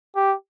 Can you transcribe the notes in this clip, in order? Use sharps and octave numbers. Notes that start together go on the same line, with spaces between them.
G4